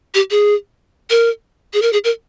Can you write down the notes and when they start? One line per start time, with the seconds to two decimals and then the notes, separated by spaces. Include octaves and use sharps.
0.14 G4
0.31 G#4
1.10 A#4
1.74 G#4
1.82 A#4
1.93 G#4
2.04 A#4